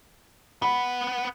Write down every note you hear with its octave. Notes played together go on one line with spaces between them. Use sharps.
B3 F#5 B5